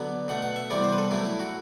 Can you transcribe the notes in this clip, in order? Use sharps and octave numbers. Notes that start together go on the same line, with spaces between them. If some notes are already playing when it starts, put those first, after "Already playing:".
Already playing: D3 F#3 B3
B2 A3 F#5
F#5
E5
C3 E3 G3 B3 D5
C5
B4
A4
A2 F#3 A3 E4
E4
F#4